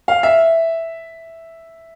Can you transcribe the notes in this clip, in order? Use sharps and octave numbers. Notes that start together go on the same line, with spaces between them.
F5
E5